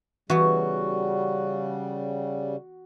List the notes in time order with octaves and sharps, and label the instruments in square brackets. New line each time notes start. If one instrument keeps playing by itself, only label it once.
[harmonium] C#3 G3 [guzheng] E3 B3 [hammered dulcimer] F#4